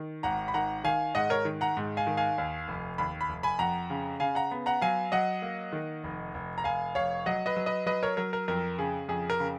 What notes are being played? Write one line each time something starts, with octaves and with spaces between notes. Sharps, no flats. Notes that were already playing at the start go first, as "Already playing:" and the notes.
Already playing: D#3
G#1 F#5 A#5
B5
D#3 F#5 A#5
D#3 F5 G#5
G#2 D#5 F#5
A#4 C#5
D#3
F#5 A#5
G#2
F5 G#5
D#3
F5 G#5
D#2
F1
D#2 B5
B5
F1
G#5 B5
F2 F#5 A#5
C#3
C#3 F5 G#5
F#5 A#5
B3
F#5 A#5
F#3 F5 G#5
F#3 D#5 F#5
A#3
D#3
F1
F1
A#5
F1 F5 G#5
F1 C#5 F5
F#3 D#5 F#5
B4 D#5
F#3
B4 D#5
F#3 B4 D#5
A#4 C#5
F#3 A#4
A#4
F2 A#4
C#3 G#4
F2 G#4
A#4
C#3